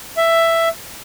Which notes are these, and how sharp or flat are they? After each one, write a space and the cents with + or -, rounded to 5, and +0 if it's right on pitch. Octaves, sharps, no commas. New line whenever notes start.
E5 +10